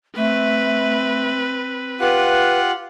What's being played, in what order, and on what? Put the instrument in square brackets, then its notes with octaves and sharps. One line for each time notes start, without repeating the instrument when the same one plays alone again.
[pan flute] A3 [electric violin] C4 B4
[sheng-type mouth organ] F4 G4 F#5 [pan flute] B4